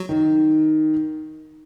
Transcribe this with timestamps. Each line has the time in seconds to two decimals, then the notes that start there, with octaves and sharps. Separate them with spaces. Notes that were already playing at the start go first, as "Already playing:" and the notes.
Already playing: F#3 F#4
0.09 D#3